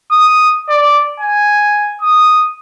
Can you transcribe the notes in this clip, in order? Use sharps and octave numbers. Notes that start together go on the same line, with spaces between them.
D#6
D5
G#5
D#6